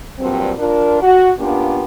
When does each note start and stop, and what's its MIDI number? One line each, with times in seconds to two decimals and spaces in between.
0.19 0.52 43
0.19 0.52 46
0.19 0.52 54
0.19 0.52 60
0.59 1.00 62
0.59 1.00 65
0.59 1.00 70
1.02 1.32 66
1.40 1.85 58
1.40 1.85 59
1.40 1.85 61
1.40 1.85 62
1.40 1.85 65
1.40 1.85 67